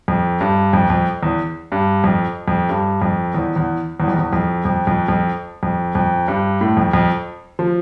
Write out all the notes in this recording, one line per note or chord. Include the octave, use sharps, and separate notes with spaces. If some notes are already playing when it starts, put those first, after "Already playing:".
F2
G2
F2
F2
E2
G2
F2
F2
G2
F2
E2
E2
E2
F2
E2
F2
F2
F2
F2
F2
F2
G2
A2
F2
F2
F3